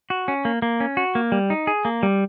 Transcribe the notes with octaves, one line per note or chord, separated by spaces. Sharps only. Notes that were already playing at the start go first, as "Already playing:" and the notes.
F#4
C#4
A#3
A#3
C#4
F#4
A#3
G3
D#4
G#4
A#3
G3